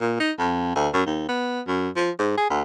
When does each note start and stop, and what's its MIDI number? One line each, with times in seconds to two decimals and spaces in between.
0.01 0.16 46
0.20 0.32 63
0.39 0.75 41
0.75 0.88 38
0.94 1.04 42
1.06 1.24 39
1.28 1.61 59
1.67 1.89 42
1.96 2.10 53
2.19 2.35 44
2.38 2.49 68
2.50 2.62 38